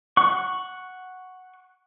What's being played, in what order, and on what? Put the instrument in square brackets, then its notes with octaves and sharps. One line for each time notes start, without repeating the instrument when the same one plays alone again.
[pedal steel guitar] F#5 C#6